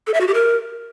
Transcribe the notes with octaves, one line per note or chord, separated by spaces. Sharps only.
A4
E5
F#4
G4
A#4